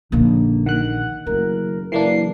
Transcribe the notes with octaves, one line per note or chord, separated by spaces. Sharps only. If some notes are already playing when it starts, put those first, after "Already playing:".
A#1 D3 A#3 D#4
D#3 F#5 F#6
F#1 A3 A#4
F#1 E3 A#3 D4 C7